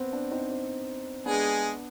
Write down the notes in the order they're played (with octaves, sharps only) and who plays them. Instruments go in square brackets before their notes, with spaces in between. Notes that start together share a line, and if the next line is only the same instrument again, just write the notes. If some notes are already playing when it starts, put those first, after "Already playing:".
Already playing: [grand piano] B3 C4
B3 D4
C4 D#4
C4
[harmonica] G#3 G#4 [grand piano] B3 D4